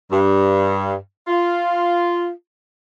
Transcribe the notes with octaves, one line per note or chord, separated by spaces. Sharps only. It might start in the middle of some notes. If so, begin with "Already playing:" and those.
G2
F4